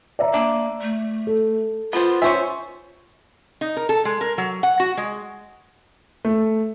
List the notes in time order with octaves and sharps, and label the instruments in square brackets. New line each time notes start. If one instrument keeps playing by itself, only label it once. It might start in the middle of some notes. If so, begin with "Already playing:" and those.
[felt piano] D5 E5 A#5
[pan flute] A#3 [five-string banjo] D4
[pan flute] A3
[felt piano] A4
[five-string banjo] B3 C5 [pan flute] F4
[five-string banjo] C#4 C5 E5 [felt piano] G#5 C#6
[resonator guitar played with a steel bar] D#4
A#4
A4
G#3
A#4
F#3
F#5
F#4
G#3
[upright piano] A3